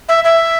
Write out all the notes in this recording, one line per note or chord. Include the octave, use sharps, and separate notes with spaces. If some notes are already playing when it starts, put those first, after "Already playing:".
E5
E5